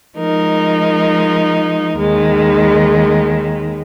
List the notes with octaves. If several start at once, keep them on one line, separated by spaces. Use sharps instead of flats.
F3 G#3 D#4 A#4
D#2 D#3 G#3